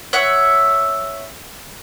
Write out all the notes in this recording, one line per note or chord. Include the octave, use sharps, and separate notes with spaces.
C#5 E5 F#5